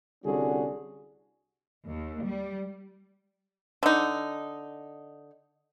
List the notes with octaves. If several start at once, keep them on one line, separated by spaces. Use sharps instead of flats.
C2 D3 G3 C#4 F#4 G#4
D#2
G3
D3 D#4